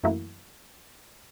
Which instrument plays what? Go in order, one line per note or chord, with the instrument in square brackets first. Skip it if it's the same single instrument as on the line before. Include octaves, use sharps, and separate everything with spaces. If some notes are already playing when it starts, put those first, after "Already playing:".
[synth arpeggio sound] F#2 E3 A3 A#3 E4 F#4